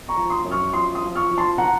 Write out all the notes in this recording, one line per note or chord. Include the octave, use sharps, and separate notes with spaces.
A#5 C#6
F3
C6 D#6
F#2
C#6 F6
F3 C6 D#6
C6 D#6
F3
C#6 F6
F3
A5 C6
F#5 A#5